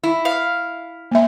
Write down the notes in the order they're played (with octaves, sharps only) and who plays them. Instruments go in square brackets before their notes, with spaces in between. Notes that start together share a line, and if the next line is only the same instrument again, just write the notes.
[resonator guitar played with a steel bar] E4
[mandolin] F5
[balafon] A#3 E5